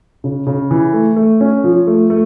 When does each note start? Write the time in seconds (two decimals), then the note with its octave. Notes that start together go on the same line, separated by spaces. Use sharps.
0.24 C#3
0.46 C#3
0.71 E3
0.93 A3
1.16 A3
1.40 C#4
1.64 F3
1.87 A3
2.10 A3